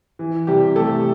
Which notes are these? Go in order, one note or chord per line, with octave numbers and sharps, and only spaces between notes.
E3
C3 G3 G4
G3 A3 A4